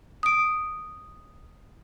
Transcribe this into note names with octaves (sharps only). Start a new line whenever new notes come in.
D#6 D7